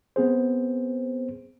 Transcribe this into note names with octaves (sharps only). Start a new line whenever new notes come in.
B3 C4 G#4 C5